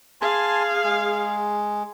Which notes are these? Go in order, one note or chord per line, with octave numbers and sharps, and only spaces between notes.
G#4 F5 G#5 A5 C6
G#3